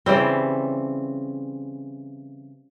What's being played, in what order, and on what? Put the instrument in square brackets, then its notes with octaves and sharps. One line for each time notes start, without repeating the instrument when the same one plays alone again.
[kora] C#3 E3 G3 C4